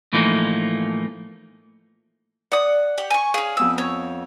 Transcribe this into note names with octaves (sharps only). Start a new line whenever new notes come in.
A2 E3 F3 A3 A#3 D#4
D5 F#5 D#6
G4 F#5
G#5 C#6
C#4 G#4 F5
F2 B3 D#6 E6
C#5